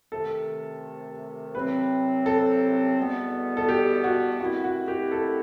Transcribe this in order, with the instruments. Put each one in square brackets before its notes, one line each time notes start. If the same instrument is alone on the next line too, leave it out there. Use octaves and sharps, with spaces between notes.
[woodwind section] C3 D#3 A3 [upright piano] A4
[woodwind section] C2 C3 F#3 C4 [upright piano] B4
[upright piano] A4
[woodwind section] E2 B2 G3 B3
[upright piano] A4
G4
F#4
[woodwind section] G2 D#3 A3 C4 E4 [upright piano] F#4
[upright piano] F#4
G4
A4